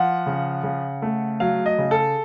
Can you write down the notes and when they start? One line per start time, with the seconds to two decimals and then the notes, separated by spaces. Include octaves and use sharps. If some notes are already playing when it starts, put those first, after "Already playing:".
Already playing: F3 F#5
0.27 C#3
0.64 C#3
1.02 A3
1.40 F#3 F5
1.66 D#5
1.78 C#3
1.91 A4